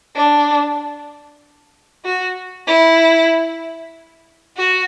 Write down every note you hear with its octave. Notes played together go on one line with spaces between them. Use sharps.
D4
F#4
E4
F#4